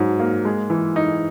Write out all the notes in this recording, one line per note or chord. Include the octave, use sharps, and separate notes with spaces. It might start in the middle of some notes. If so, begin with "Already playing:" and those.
Already playing: G#2 F#3
A#3
G#3
E3
D#4